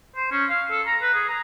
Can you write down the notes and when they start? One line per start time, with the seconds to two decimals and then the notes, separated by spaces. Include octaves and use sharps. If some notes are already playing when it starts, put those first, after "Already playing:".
0.16 C5
0.32 C#4
0.50 F5
0.71 A4
0.87 A#5
1.02 B4
1.14 G#4
1.29 A#5